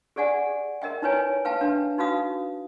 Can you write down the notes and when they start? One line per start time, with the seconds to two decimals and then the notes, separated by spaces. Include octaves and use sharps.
0.16 G4 G#4 D5 F#5 G#5
0.82 A#4 D#5 E5 G5
1.02 D#4 E4 B4 C#5 G#5
1.45 B4 F5 G5 A5
1.61 D4 B4 E5
1.98 D#4 F#4 B4 F5 D#6